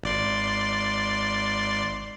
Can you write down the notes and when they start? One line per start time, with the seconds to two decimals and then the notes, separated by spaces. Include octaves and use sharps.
0.04 G#1 D5 C6